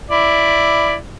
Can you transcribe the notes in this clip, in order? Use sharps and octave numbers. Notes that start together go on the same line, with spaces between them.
E4 D5